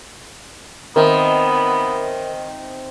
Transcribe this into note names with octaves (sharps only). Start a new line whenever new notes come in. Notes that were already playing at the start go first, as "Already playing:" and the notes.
D#3 B3 C4 A#4 D#5 E5